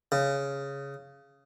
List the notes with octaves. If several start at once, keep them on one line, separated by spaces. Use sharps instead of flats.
C#3